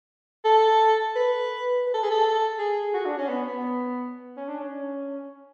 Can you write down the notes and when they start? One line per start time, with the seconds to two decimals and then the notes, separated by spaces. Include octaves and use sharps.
0.45 A4
1.16 B4
1.87 B4
1.94 A4
2.03 G#4
2.11 A4
2.59 G#4
2.94 F#4
3.06 D4
3.18 C#4
3.29 B3
3.47 B3
4.37 C#4
4.48 D4
4.60 C#4